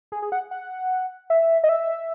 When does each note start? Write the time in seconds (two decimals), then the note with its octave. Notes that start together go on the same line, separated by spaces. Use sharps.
0.12 G#4
0.22 G#4
0.32 F#5
0.51 F#5
1.30 E5
1.64 D#5
1.69 E5